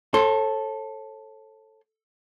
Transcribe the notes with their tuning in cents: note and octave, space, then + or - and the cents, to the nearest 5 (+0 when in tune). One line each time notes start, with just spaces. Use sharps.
A4 +0 C#5 -40 C6 +10